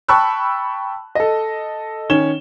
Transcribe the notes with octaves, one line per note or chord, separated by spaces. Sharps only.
G5 A5 B5 C#6 E6 F#6
A4 D#5
D#3 C#4 C#5 E7 G7